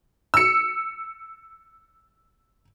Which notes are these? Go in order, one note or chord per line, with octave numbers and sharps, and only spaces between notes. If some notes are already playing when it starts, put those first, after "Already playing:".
E6 C#7